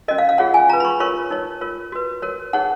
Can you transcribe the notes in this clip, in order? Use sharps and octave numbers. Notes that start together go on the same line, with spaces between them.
C#4 F#4 A#4 D#5
F5
F5
F4 G#4 C#5 F#5
G#5
F4 B4 A#5
B5
C#6
F4 A#4 C#5 C#6
D#4 A#4 C#5
F4 A#4 C#5
F#4 B4
F#4 A#4 C#5
D#4 G#4 C#5 F#5